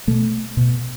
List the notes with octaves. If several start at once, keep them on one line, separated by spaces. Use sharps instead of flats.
B2 A3
B2